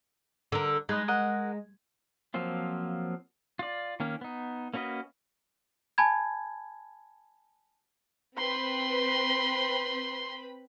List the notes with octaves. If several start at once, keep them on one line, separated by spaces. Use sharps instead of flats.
D3 A#4
G#3 D#4 B4 D#5
A#4 D#5 F#5
F3 F#3 A#3 C4 F4
F4 D5
D#3 A#3 C#4
B3 D#4
A#3 C#4 F#4 B4 D#5
G#5 A5 B5 G#6
C4 B4 B5 C6